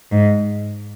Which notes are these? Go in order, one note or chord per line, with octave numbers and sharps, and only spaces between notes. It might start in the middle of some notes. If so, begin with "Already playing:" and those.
G#2